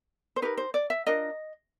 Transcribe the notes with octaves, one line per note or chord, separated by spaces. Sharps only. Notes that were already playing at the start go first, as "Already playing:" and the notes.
C5
D#4 G4 A#4 B4
C5
D5
E5
D4 F4 A#4 D#5